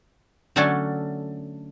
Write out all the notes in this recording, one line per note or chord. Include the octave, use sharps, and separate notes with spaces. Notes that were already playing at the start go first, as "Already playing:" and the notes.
D3 F#3 A3 C#4 D4 A4